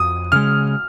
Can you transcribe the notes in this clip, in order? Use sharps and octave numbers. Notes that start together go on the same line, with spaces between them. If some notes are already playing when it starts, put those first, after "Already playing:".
Already playing: F2 D#6
C#3 G#3 F6